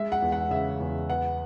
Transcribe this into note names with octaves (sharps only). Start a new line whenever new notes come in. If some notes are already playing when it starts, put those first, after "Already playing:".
Already playing: G#3 E5
F#5
E2
F#5
C#3 E5
E2
B3 F#5